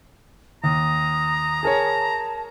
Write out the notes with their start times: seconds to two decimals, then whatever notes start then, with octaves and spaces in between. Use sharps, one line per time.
0.64 D#2 A#5 D#6
1.63 G#4 A#4 C#5 A5